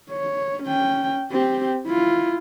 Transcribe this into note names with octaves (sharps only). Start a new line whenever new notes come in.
C#5
C#4 G5
C4 G4
E4 F4